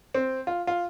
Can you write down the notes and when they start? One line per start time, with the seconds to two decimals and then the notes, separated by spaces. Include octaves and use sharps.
0.14 C4
0.47 F4
0.67 F4